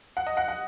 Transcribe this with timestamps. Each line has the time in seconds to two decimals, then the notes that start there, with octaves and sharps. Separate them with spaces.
0.17 F#5
0.27 D#5
0.37 F#5
0.48 F#5